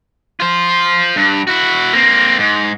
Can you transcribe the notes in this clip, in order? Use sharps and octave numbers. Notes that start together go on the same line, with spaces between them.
F4 C5
G2
E4 F#4
A#3 C4
G#2